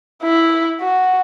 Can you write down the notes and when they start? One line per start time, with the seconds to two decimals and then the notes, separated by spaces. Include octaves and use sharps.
0.23 E4
0.81 F#4